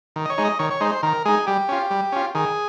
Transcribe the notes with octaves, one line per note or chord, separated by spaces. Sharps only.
D#3
D#5
C#5
G#3 D#4
D#5
D#3 C#5
C#5
G#3 D#4 C5
C5
D#3 A#4
G#3 D#4 G#4
G3 G4
C#4 F4
G3
C#4 F4
D#3 G#4